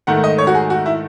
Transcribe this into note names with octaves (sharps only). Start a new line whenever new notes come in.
G#2 D#3 A3 F#5
D#5
C#5
F#4
G#4
F#4
E4